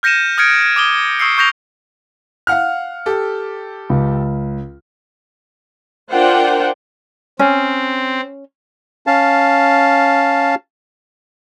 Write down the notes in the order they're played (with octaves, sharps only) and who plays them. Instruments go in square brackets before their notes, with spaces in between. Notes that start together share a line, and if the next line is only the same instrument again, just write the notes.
[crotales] F6 G6 A#6 C#7 D#7 E7
D#6 F6 G#6 C#7 D7
G#6
D6 D#6 G7
C#6 D#6 E6 G6 C7 C#7
C#6 G6 A#6 F7
[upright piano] F5 F#5 F6
G4 A4
[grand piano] C#2
[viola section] D4 F4 A#4 C5 F#5 G5
[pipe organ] C4 [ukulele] C#4
[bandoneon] C#4 F5 A5